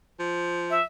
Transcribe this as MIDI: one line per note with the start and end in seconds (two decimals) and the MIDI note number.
0.20 0.79 53
0.70 0.83 76